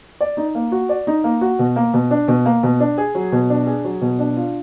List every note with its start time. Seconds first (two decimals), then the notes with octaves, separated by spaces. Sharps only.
0.21 D5
0.37 D#4
0.55 A#3
0.72 F#4
0.89 D5
1.07 D#4
1.24 A#3
1.41 F#4
1.59 B2
1.76 A#3
1.94 B2
2.11 D4
2.28 B2
2.46 A#3
2.63 B2
2.80 D4
2.98 G#4
3.15 F#3
3.32 B2
3.50 D4
3.67 G#4
3.84 F#3
4.02 B2
4.19 D4
4.36 F4